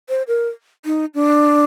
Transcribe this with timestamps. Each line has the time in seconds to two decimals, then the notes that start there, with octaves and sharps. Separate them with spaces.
0.09 C5
0.28 A#4
0.85 D#4
1.14 D4